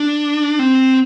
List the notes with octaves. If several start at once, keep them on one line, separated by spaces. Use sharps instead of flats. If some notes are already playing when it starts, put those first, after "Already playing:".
Already playing: D4
C4